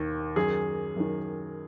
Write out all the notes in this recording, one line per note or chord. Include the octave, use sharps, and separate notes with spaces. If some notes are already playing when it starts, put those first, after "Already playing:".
Already playing: D#2 D#3
F#2 D#3 G#4
F#2 D#3